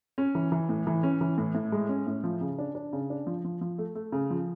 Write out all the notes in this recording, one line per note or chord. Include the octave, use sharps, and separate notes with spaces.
C#4
E3
E3
A2
E3
C#4
E3
A2
A2
G#3
C#4
A2
F3
C#3
D4
D4
C#3
D4
F3
F3
F3
A3
A3
C#3
F3